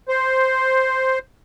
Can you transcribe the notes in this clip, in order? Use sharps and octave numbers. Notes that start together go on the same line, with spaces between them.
C5